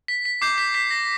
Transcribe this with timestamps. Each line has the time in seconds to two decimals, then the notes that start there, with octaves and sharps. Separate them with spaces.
0.08 B6
0.25 B6
0.42 D6 G6 C7
0.58 B6
0.74 B6
0.91 A#6